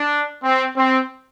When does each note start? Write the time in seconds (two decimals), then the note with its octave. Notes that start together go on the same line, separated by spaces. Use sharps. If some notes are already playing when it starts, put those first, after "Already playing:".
Already playing: D4
0.44 C4
0.77 C4